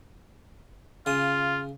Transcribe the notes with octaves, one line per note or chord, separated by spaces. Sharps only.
C#3 F4 D#6